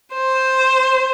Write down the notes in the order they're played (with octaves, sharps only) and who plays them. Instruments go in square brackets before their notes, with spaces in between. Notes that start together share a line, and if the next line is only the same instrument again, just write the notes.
[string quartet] C5